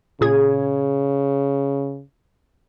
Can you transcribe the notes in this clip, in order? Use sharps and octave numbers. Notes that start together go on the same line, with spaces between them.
A#2 C#3 G#4 G#6